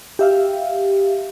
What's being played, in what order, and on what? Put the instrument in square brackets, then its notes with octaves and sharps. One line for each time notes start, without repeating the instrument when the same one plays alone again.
[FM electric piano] G4 E5 F5